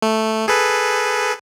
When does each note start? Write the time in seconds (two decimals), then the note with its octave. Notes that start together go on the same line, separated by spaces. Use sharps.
0.02 A3
0.48 G#4 A4 B4